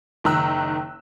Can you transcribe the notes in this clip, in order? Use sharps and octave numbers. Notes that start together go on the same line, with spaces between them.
F#1 D#3 A#5 E6 F#6